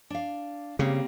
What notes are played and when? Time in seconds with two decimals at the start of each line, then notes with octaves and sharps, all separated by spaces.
0.10 D4 F5
0.79 C#3 G3 A#3 C4